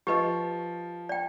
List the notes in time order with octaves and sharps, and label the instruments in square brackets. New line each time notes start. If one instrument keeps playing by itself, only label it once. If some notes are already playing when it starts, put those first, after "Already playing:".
[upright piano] F3 [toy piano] G4 B4 D#5
[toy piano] D5 G5